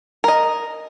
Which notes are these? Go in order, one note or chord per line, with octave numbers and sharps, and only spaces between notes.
A#4 D#5